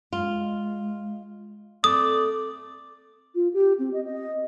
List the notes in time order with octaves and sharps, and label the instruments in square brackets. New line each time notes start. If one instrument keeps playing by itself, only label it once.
[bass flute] G#3 [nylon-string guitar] F4
[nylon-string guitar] A3 [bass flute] C4 [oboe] D5 [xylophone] D#6
[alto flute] F4
G4
C4
D#5
D#5